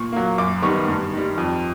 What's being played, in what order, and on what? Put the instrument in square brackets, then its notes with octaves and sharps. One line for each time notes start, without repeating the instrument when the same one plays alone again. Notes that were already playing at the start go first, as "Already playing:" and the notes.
Already playing: [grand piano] A#2 C#6
F#3 A#3
F#2 D6
D#3 G3 B3 C#6
G2
D#3 G3
F2